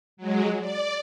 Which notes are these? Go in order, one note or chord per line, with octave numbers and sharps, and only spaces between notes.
F#3 G#3
D5